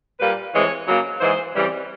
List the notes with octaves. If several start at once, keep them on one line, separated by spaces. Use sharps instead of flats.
A#2 G3 A#3 B4
A2 E3 G#3 C4 C#5
C#3 F#3 A#3
G#2 E3 G#3 C5
C#3 E3 G3 C4